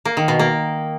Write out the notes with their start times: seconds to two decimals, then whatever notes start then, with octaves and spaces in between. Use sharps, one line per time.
0.05 A#3
0.17 D#3
0.28 B2
0.39 A#3